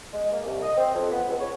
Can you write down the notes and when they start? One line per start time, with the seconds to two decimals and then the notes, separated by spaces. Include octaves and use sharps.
0.13 G#3
0.32 A#3
0.46 C2
0.63 D#5
0.77 C4
0.94 F2
1.11 B3
1.29 C#2
1.40 C#5